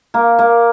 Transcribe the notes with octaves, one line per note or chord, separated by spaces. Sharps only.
A#3
A#3